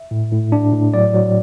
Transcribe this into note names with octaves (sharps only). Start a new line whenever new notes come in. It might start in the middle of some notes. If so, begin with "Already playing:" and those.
Already playing: E5
A2
A2
D4
A2
F#3 D5
F#3